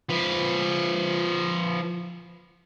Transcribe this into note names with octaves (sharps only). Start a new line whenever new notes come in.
F3 B4